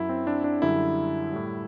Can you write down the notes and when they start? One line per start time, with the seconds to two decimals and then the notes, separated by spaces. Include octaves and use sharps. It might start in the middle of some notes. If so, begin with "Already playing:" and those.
Already playing: F#2 F#3 E4
0.09 C4
0.27 D4
0.44 D4
0.62 F#2 D3 G3 E4
1.32 A2 G3